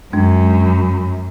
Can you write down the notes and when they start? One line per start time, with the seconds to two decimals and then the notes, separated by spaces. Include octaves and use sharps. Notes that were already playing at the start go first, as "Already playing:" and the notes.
0.13 F#2 G#3 D4